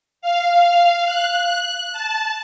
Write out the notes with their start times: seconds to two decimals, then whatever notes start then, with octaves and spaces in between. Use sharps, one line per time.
0.22 F5
1.06 F#6
1.93 A5